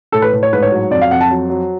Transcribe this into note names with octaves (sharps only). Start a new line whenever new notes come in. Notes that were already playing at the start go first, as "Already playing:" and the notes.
A2 A4
B4
A2
C#5
G#2 B4
C#5
F#3
F2 D5
F5
F2 F#5
A5
F#3
F#3